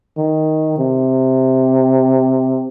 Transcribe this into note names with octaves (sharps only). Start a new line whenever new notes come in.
D#3
C3